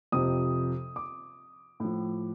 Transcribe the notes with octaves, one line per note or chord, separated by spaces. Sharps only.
F2 C3 F3 D#6
D6
A2 F3